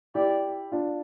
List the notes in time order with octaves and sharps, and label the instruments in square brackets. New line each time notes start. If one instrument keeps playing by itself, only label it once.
[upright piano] E4 G4 [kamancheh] D5
[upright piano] D4 F4